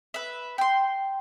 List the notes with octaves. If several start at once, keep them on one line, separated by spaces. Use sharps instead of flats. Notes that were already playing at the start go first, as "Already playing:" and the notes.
B4 E5
G5 C6